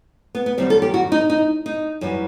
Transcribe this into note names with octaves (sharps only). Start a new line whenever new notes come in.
B3
B3
F#2 D#3 G3 C4
A4
G4
F#4
D#4
D#4
D#4
F#2 E3 G3